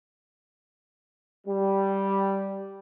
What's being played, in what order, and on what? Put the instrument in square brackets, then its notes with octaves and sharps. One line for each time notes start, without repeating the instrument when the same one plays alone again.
[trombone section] G3